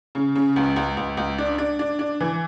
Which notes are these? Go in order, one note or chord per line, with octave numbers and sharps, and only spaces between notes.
C#3
C#3
C#2
C#2
C#2
C#2
D4
D4
D4
D4
E3